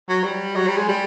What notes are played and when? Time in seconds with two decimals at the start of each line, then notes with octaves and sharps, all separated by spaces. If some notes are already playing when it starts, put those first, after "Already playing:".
0.09 F#3
0.24 G3
0.56 F#3
0.67 G3
0.77 G#3
0.89 G3